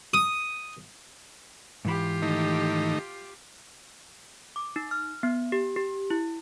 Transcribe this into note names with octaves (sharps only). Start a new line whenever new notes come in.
D#6
G#2 E3 F4 G4 B5
D#3 A3 D#4
D6
D#4
F6
B3
G4
G4
E4